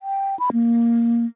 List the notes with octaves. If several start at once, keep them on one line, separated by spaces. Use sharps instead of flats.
G5
B5
A#3